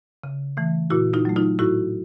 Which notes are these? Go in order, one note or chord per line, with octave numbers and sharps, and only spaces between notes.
C#3
E3 A3
A#2 E4 F#4
D#4 F4
F#3 A3
D#4 F4
A2 E4 F#4